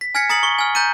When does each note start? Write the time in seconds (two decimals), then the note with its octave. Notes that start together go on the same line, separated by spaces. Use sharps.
0.01 B6
0.15 G#5 F6 G#6 A#6 B6 C#7
0.29 A#5 D#6 A6 C#7 F#7
0.43 C#6 G7
0.59 G#5 F6
0.75 A#5 G6 A6 D#7